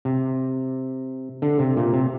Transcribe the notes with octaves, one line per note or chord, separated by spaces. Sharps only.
C3
D3
C3
A#2
C3